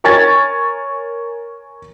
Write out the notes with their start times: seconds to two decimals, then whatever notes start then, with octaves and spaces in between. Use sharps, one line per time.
0.04 A#4 C#5 G#5 C#6 G#6 A6